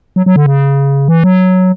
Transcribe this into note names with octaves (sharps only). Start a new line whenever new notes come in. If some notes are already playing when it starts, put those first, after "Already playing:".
F#3
F#3
D3
C#3
E3
F#3